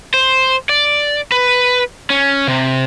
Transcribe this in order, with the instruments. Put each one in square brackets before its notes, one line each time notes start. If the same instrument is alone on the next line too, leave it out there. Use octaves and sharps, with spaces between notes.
[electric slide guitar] C5
D5
B4
C#4
C3